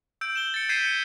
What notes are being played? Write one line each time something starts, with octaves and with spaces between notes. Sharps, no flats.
E6 G6 D7
E7 G7
A6 C#7
G6 G#6 B6 C7 D#7 E7
C#7